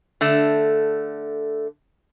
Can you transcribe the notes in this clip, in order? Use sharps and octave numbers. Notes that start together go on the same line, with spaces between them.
D3 A3